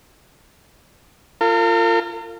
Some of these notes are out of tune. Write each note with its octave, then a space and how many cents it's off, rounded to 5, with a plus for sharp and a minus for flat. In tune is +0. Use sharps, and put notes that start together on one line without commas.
F4 -15 A#4 -45